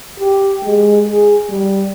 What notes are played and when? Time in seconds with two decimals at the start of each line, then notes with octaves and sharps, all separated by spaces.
0.20 G4
0.65 G#3
1.09 G#4
1.50 G3